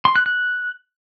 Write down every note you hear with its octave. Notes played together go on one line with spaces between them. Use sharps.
C6
F#6
F#6